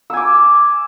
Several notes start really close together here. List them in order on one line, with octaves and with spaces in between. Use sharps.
E6 G#5 D6